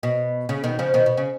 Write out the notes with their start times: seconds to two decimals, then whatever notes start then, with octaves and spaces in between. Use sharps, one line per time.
0.03 B2
0.49 C#3
0.64 B2 D#3
0.79 C#3 F3
0.94 B2 D#3
1.06 B2
1.17 C#3